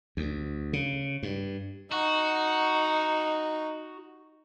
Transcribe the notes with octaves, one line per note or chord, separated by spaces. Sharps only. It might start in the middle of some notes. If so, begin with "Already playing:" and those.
D2
C#3
G2
D#4 F#4